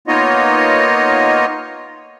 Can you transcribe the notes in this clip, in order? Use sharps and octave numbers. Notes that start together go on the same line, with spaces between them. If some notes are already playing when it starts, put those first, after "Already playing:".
A#3 B3 D#4 F4 C#5 D#5